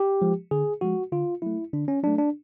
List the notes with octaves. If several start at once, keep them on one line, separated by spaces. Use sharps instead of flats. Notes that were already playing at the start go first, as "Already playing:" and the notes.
Already playing: G4
F3 G#3
D3 G#4
F3 G#3 F#4
D3 F4
F#3 A3 E4
D3 D4
C#4
F#3 A3 D4
D4